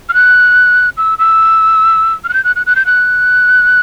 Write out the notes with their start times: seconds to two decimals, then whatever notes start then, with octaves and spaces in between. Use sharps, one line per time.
0.09 F6
0.14 F#6
0.97 E6
1.19 E6
2.24 F6
2.29 F#6
2.34 G6
2.44 F#6
2.56 F#6
2.66 F#6
2.76 G6
2.86 F#6